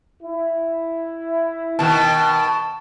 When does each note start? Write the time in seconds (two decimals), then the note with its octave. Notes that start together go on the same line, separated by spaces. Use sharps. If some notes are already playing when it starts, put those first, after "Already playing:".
0.23 E4
1.79 B2 D#3 A5